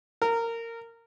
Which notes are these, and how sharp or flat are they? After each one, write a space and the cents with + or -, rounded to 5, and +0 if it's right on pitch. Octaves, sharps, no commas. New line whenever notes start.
A#4 -20